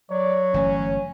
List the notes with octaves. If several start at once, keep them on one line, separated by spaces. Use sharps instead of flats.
F#3 C#5 D5
G1 E3 A3 C#4